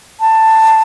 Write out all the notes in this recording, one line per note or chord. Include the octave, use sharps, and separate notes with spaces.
A5